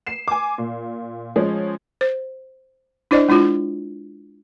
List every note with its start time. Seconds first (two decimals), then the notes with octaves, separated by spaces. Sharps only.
0.07 C7 E7
0.28 G#5 D6
0.58 A#2
1.36 F3 G#3 C#4
2.01 C5
3.11 D4 E4 C5 D5 D#5
3.29 G#3 D4 E4 F4